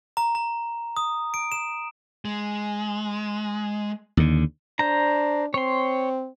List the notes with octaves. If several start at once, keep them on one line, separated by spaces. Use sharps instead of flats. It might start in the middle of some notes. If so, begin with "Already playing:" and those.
A#5
A#5
D#6
D7
E7
G#3
D#2 D3
D4 C5 A#5
C4 C#5 C6